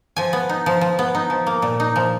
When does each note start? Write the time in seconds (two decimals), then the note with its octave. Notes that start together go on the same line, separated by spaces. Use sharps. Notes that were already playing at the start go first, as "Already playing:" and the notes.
0.16 F3 G#5
0.33 B3
0.49 D#4
0.66 F3
0.81 F3
0.99 B3
1.15 D#4
1.30 F3
1.47 A#3
1.62 A#2
1.80 D#4
1.96 F3